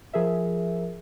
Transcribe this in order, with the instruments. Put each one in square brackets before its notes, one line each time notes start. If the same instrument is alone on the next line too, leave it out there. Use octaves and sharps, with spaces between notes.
[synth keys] F3 G#4 A#4 E5